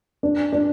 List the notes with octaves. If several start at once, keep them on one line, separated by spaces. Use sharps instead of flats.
D4
D4